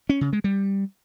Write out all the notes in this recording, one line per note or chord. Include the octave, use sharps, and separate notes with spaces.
C#4
C#3
G#3
G3